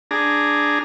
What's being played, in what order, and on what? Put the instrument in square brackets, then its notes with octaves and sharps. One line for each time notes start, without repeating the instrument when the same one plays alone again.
[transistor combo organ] D4 G#4 A#5